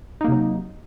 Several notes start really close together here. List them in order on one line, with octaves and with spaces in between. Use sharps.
D#4 A#3 C3 F#3